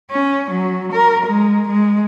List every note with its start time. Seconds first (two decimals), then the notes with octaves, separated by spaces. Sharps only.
0.10 C#4
0.51 F#3
0.92 A#4
1.26 G#3
1.68 G#3